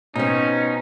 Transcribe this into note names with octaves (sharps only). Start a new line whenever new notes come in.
B2 C4 C#4 D#4